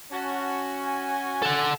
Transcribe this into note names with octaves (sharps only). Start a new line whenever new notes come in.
C#4 F#4 A5
G#5
A4 F#5